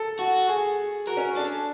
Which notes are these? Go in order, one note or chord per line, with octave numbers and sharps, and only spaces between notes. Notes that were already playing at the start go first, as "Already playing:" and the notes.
Already playing: A4
F#4
G#4
F#4 A#4
C#4
D4 A4